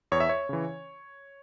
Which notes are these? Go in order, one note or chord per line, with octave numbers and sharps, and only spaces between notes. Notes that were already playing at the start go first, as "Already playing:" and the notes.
E2 C#5
E5
C#5
C#3 E3